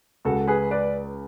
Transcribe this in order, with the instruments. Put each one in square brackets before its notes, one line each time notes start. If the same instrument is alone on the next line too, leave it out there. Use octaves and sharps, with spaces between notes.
[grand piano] C#2 [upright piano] F#4 A4
[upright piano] G#4 B4
B4 D5